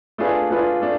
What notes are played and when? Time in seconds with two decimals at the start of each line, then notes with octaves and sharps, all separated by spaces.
0.18 A3 D4 F4 G#4 B4
0.50 A3 D4 F4 G#4 B4
0.81 A3 D4